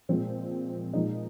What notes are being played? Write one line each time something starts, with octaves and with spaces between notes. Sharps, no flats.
A#2 F3 G#3 C4
A#2 F3 G#3 D#4